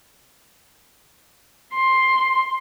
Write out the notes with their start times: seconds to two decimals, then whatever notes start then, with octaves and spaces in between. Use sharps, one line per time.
1.74 C6